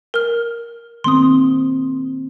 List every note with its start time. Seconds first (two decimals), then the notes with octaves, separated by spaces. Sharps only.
0.14 A#4 F6
1.04 D#3 A#3 C4 C6 D#6